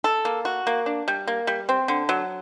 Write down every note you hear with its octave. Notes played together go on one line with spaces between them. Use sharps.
A4
A#3
F#4
A#3
D4
G3
A#3
G3
C4
D3
F#3